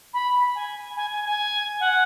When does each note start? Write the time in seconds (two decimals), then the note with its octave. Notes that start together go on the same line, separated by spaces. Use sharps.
0.13 B5
0.55 G#5
0.97 G#5
1.11 G#5
1.24 G#5
1.80 F#5